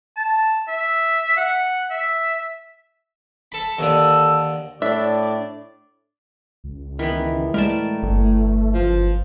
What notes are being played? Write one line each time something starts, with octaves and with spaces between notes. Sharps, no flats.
A5
E5
F#5
E5
A4 B5
D#2 D3 A4
A2 D4 D5 E5
C#2
D#3 E3 B3
A2 G#3 A#4 D5 A5
G1 A3
F#1 F3